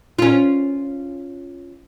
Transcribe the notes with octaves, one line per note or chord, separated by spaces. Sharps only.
C#4 F4